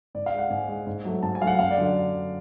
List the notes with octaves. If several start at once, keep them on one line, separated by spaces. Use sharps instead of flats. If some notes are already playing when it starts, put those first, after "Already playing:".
G#2 D5
F5
G#3
F#5
G#2 G#5
G#3
G#2
F#3 A3
G#2 A5
G#5
F#3 A3 F5
F#5
F#2 F5
D5
D3 F#3